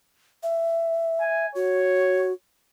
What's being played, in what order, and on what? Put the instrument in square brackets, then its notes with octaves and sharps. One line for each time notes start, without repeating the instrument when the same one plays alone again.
[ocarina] E5
[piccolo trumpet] G#5
[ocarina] F#4 [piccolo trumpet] C#5